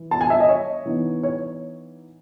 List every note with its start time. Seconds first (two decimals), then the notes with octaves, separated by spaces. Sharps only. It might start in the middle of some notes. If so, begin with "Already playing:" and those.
Already playing: E3
0.11 A5
0.21 G#5
0.30 E5
0.40 D#5
0.49 C#5
0.86 E3 B3 D#4
1.23 C#5